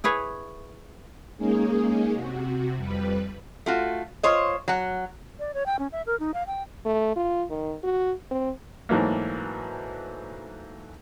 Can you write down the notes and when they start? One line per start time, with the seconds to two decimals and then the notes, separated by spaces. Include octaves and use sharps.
0.04 E4 G#4 B4 C#5
1.38 G#3 A#3 C#4 D#4 G#4
2.14 C3 F#4
2.76 F2 G3 B4
3.66 A3 F4 F#4
4.23 F4 C5 C#5 D#5
4.68 F#3 F#5
5.39 D5
5.54 C#5
5.66 G5
5.79 C#4
5.92 E5
6.07 A#4
6.20 D#4
6.34 F5
6.47 G5
6.85 A3
7.16 F4
7.50 D#3
7.83 F#4
8.31 C4
8.89 G#2 E3 F#3 A3 A#3